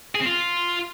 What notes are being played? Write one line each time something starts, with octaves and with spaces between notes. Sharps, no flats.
G#4
C4
F4